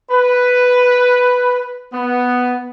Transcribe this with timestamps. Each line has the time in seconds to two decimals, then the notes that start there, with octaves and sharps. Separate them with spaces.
0.11 B4
1.93 B3